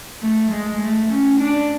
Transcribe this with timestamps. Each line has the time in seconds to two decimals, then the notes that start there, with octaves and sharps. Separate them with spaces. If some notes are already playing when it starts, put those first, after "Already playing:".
0.22 A3
0.51 G#3
0.81 A3
1.11 C#4
1.40 D4